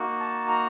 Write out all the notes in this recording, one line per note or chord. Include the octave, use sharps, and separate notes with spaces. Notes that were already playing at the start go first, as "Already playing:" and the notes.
Already playing: A#3 D#4 F#4
A5
A#5